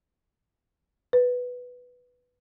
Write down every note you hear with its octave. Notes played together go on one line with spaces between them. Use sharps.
B4